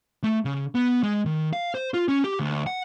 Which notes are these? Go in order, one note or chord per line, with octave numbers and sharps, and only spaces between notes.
A3
C#3
B3
G#3
D#3
F5
C5
F4
C#4
G4
D2
F#5